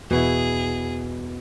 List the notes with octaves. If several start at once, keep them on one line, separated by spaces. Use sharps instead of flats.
E2 B2 B3 E4 G#4